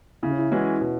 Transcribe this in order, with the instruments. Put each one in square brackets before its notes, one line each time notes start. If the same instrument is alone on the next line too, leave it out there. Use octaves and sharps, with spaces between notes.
[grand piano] C#3 [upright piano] E4
[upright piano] C#4
E4
[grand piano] E3 G#3 C#4 F#4
[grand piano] B2 [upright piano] B4